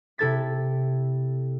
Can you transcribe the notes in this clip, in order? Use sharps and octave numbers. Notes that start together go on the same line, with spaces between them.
C3 E4 A4 G#6 A6 B6